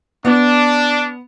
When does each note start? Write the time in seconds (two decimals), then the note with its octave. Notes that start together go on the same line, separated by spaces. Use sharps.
0.25 B3 D4